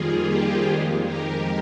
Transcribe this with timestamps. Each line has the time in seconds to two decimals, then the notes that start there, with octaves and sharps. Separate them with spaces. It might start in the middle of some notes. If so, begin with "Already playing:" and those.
Already playing: F2 D#3 G3 A#3 F4 G#4
0.28 G4
0.68 F2 D#3 G#3
1.06 G4 A#4